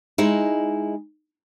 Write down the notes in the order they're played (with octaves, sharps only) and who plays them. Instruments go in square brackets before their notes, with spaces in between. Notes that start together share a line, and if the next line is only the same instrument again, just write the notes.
[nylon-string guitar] G#3 D#4 E4